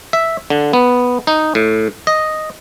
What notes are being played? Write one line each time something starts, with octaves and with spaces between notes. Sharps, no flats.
E5
D3
B3
D#4
A2
D#5